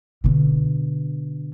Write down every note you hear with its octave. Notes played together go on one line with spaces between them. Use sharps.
B2 D3